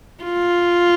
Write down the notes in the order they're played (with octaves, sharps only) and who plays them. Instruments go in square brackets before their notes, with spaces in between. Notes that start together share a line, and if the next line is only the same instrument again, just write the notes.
[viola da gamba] F4